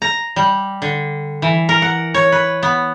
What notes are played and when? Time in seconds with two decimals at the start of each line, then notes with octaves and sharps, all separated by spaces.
0.02 A#5
0.36 G3
0.82 D3
1.42 E3
1.69 A#4
1.82 F#5
2.14 C#5
2.32 B4
2.63 B3